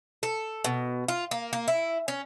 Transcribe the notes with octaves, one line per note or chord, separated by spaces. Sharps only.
A4
B2
F4
A#3
A#3
E4
C#4